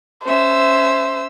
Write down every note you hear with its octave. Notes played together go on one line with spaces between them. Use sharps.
C#4 C5 E5 E6